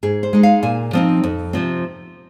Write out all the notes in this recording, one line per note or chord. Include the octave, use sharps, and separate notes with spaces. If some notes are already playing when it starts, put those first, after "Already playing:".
G#2 G#4
C5
G#3 D#4
F5
A#2 G#5
F3 C4 D#4
F2
C3 F3 C4